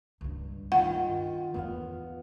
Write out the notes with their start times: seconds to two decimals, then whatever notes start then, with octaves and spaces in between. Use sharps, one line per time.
0.21 C#2 G2
0.72 D#3 F4 F#5
1.54 E2 B3 F4 F5